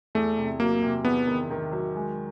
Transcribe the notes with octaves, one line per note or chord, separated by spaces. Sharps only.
E2 A3
C3
F#3 A#3
C3
E2 B3
D#3
D#3
F#3
G#3